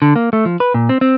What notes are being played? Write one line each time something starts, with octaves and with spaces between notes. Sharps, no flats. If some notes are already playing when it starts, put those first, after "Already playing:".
D3
A#3
A3
F3
B4
A#2
C4
C4